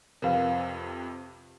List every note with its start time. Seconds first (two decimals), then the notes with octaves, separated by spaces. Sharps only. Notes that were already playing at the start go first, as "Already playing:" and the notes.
0.22 F2 C3 A#4 B4 F5